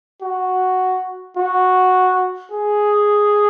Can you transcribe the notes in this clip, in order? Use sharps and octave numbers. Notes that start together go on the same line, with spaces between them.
F#4
F#4
G#4